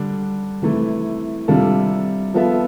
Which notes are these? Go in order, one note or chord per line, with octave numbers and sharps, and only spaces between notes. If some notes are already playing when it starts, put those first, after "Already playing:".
Already playing: D3 G3 D4
C3 E3 A3 E4
C3 G3 D4 F4 A4
F3 B3 F4 A4 E5